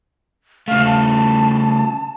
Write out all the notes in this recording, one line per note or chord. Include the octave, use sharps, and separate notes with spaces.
C#3 A3 F5
A5